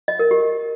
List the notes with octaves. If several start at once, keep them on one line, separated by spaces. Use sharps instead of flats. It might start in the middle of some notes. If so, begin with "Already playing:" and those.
D#5
A#4
G4